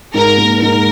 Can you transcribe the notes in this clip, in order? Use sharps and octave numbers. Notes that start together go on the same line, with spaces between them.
G#2 A#4
A#3
G#2 A#4